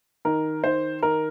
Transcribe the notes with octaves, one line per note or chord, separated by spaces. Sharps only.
D#3 A#4
D#3 C5
D#3 A#4